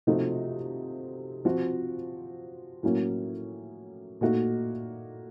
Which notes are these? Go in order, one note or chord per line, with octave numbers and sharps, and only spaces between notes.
C3 F3 A3 D#4 F#4
F3 C4 F#4
A2 F#3 A#3 C#4 F#4
A#2 A3 D#4 F#4